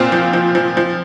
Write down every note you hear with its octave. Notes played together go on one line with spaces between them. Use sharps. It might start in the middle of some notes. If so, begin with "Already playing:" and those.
Already playing: A#2 C4 F4
F3
F3
F3
F3